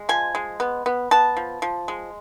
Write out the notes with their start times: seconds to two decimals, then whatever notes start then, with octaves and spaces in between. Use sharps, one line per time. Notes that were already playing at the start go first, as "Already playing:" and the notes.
Already playing: G#3
0.09 F3 G#5
0.35 G#3
0.60 B3
0.86 B3
1.11 B3 A5
1.37 F3
1.62 F3
1.88 G#3